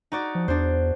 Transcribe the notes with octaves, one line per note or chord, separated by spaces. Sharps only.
D#4 F#4 D5
F3
E2 D4 C5